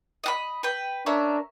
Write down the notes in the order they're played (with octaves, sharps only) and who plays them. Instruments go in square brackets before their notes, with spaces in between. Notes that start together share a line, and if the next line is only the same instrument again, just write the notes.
[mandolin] D#5 F#5 B5
B4 G5
[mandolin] C#4 A#4 E5 [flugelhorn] D4